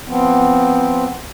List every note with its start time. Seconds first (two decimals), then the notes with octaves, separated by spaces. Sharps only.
0.08 F3 B3 C4